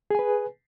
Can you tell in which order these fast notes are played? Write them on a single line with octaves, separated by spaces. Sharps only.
G#4 G#5 B4